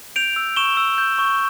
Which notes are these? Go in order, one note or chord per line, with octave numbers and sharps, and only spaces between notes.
G6 D7 F7
E6
C#6 E7 G7
E6
G6
C#6